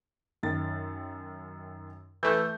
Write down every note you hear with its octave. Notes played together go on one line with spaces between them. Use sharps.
F#2 D#3 A6
E3 A3 G6